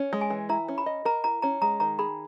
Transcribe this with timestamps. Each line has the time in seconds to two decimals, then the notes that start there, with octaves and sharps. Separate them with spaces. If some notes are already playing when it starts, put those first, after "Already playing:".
Already playing: C#4
0.13 G#3
0.21 G#5
0.30 E3
0.49 E4 A#5
0.68 C#4
0.78 B5
0.86 D#5
1.05 A#4 A#5
1.24 E4 A#5
1.42 C#4 A#5
1.61 G#3 A#5
1.80 D#3 A#5
1.99 G#4 B5